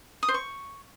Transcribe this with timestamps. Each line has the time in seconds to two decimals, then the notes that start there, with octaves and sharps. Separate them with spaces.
0.23 D#6
0.28 C5
0.34 C#6